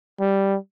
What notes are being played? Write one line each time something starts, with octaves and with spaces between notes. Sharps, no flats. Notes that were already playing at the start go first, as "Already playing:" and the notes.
G3